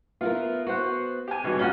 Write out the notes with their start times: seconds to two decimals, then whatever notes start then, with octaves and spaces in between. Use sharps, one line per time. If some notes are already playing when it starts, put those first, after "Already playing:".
0.21 B3 E4 F4 A#4
0.67 B3 F#4 C5 F#5
1.28 G4 G#5
1.44 G#1 G2 C#3 F#4
1.59 D#2 A#3 C#4 F4 F#4